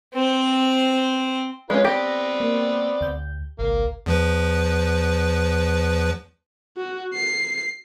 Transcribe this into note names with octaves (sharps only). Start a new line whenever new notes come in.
C4 C5
G#3 C#4 F4 B4 B5
B3 C4 G4 D5 A#6
A#3
D2 G6
G#1 C#2 A#3
E2 F3 B4
F#4
C7